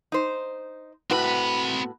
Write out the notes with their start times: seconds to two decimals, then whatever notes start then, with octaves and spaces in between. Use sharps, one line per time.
0.12 D#4 C5
1.10 A2 C4 F#4 B4 B5